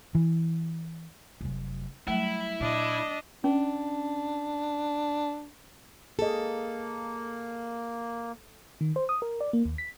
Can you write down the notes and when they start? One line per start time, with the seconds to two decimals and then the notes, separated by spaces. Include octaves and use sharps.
0.15 E3
1.41 F1 F#3
2.08 F#3 G3 A3 E4
2.60 A#2 D4 D#5
3.44 C#4 D4
6.19 A#3 G#4 A4 D#5
8.81 D#3
8.96 C5
9.09 D#6
9.22 A#4
9.41 D5
9.53 A#3
9.65 D#2
9.78 B6